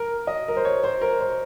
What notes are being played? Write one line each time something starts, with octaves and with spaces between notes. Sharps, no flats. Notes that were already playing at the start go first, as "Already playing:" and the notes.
Already playing: A#4
D#5
A#4
C5
C#5
C5
A#4
C5